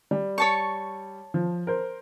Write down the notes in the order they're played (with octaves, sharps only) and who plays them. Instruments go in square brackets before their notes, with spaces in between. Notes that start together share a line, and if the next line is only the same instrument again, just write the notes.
[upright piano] G3
[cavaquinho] C#5 A5 C#6
[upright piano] F3
A#4 C5